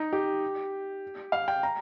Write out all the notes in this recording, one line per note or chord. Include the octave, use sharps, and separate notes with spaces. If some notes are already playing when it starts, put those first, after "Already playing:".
Already playing: D#4
G4
F5
G5
A#5